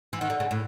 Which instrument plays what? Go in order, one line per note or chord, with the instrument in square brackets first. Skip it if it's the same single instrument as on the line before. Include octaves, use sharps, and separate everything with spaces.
[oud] E3
[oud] D#3 [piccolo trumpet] F#5
[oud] D3
C#3
A2